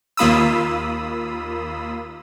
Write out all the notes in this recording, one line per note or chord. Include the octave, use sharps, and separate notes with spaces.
D#2 A#3 F4 B5 D#6 E6